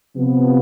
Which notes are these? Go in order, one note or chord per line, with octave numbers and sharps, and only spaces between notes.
C3 F3 B3